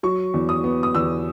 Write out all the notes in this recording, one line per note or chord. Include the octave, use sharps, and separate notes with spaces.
F#3 C#6
E2
D#6
B3
D#6
E2 E6